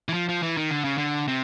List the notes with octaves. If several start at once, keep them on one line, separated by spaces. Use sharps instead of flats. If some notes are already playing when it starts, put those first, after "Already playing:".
E3
F3
F3
E3
D#3
D3
C#3
D3
C3